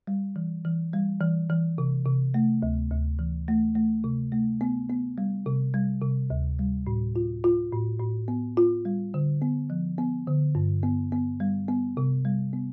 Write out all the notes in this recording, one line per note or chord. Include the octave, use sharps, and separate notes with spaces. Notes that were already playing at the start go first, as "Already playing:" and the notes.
G3
E3
E3
G3
E3
E3
C3
C3
A3
D2
D2
E3
A3
A3
C3
A3
B3
B3
G3
C3
G3
C3
D2
G3
A2
F4
F4
A2
A2
B3
F4
G3
D3
B3
F3
B3
D3
G2
B3
B3
G3
B3
C3
G3
B3